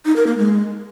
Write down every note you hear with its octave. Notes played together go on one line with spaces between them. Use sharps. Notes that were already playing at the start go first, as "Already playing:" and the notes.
D#4
A#4
A#3
G#3